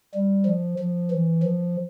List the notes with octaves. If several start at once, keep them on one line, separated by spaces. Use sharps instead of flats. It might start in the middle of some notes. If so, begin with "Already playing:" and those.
G3
F3
F3
E3
F3